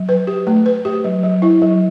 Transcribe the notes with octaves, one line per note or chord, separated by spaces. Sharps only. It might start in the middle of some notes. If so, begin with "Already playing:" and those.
Already playing: F#3
B4
G4
A3
B4
G4
F#3
F#3
E4
F#3